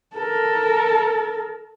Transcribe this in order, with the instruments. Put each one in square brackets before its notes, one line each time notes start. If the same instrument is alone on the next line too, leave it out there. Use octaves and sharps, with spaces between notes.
[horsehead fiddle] A4 A#4